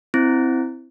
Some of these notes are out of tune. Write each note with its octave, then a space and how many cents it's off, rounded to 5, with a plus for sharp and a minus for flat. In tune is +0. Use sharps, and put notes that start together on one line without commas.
C4 +0 E4 +0